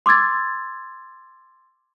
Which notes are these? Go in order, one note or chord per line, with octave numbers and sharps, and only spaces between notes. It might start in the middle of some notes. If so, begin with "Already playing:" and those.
C6 D6 E6 G#6 A6